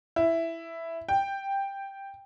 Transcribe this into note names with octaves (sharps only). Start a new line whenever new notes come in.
E4
G5